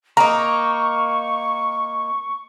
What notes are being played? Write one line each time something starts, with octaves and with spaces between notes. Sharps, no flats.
A#3 D#4 A#5 C#6